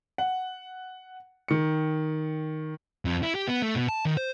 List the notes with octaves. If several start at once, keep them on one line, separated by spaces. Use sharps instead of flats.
F#5
D#3 C#7
F2
E4
G4
B3
A3
B2
A5
D#3
C5